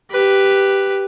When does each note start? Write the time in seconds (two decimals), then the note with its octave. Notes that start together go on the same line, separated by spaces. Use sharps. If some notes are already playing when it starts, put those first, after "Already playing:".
0.11 G4 B4